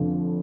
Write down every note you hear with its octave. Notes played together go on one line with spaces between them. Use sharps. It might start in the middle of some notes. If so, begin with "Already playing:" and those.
Already playing: F1 F2 D3 F3